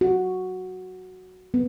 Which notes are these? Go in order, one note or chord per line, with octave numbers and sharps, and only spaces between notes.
F#4
B3